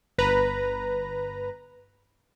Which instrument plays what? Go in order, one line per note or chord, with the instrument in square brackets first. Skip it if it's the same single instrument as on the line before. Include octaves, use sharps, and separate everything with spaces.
[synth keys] G1 B4 A#5